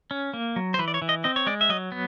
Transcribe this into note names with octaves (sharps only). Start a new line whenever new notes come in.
C#4
A#3
F#3
C5
E3 B4
D5
C#5
E3
D#5
C4 D#5
C#5
G#3 D5
E5
F#3 D#5
B3